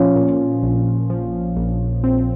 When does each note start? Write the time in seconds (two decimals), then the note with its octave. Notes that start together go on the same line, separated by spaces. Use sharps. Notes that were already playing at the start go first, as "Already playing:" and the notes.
Already playing: A#2 F3 C#4 F4
0.16 A#2
0.63 A#1
1.10 F3
1.57 A#1
2.04 C4